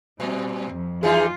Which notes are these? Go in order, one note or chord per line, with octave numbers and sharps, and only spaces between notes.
A#2 G3 C4
F2
E3 G3 D#4 F4 G#4